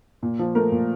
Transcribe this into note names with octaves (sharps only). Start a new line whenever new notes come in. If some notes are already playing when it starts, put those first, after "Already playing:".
A#2
F3
A3 A#4
A#2